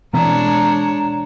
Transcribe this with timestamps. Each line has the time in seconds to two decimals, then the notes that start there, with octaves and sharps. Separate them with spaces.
0.13 B2 E3 G#3 C4 D4 C#5 A#5